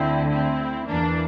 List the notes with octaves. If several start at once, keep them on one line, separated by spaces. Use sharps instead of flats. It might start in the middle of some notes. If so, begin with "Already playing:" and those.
Already playing: D2 D3 C4 E4
C4 E4
E2 E3 A#3 D4